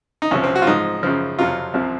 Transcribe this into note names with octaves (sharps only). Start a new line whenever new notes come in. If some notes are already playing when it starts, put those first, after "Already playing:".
D#4
C2 C3 F3 C#4
C4
F#4
F4
G#2 F3 D#4
F#2 C#3 F3
F2 C3 F#3 F4
C2 C3 F3